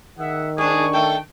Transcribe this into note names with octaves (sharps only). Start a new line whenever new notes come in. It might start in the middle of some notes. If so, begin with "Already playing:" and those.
D#3 G#4 E5 F#5
G#2 D4 G#4 C#6
A3 A4 G5